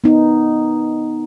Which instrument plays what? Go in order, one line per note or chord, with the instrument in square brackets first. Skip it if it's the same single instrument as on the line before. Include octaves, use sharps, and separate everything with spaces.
[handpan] B3 D#4